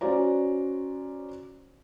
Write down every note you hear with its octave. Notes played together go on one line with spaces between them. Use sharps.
C#4 F#4 C5 D5 A#5